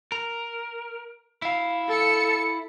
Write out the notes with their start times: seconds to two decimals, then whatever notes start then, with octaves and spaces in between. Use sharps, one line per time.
0.12 A#4
1.42 E4 F5
1.88 A4 C#7